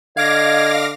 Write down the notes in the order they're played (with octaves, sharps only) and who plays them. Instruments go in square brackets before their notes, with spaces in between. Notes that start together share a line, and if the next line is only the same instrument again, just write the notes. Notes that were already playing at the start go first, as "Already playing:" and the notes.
[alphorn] D3 [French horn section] D#5 [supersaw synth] F5 D6 A#6 [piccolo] G#6